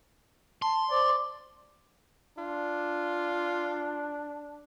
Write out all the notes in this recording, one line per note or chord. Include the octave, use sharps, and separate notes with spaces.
A5 C6
C5 D5
D4 F4